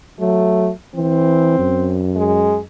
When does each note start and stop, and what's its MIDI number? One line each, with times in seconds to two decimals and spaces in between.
0.20 0.71 54
0.20 0.70 57
0.95 1.56 52
0.95 2.02 60
1.59 2.67 42
2.16 2.57 56